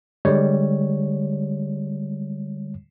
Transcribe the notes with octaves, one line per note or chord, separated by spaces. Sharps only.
D3 G3 G#3 C#5